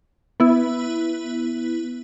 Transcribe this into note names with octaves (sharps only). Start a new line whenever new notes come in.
B3 E4